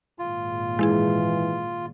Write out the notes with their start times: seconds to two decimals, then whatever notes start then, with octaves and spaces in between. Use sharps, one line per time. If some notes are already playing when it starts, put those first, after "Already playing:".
0.19 G#1 A#2 F4
0.79 E3 G#3 E4 G#4